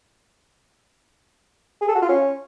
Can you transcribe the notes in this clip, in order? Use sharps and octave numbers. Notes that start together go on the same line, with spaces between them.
G#4
A4
F#4
F4
C#4